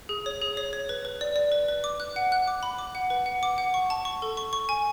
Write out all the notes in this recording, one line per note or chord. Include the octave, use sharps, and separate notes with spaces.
G#4
C#5
G#4
C#5
C#5
B4
B4
D5
D5
B4
B4
D6
F#6
F#5
F#6
D6
B5
D6
F#5
B4
F#5
D6
F#5
C#6
A5
C#6
A4
C#6
C#6
G#5